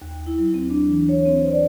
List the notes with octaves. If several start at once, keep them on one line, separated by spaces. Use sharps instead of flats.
D#2
E4
F#3
C4
D4
E3
C#5
C4
C5
D5